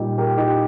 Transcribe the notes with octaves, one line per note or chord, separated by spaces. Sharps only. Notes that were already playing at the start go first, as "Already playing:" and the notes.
Already playing: A#2 G3 D#4 G4
G4 A#4
D#4 G4